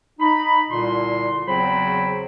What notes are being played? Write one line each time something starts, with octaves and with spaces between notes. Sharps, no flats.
D#4 B5
C2 A#2 D3 C6
E2 C#3 F#3 C4 C5 B5